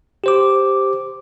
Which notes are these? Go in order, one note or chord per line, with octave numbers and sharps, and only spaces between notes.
G4 C5 D6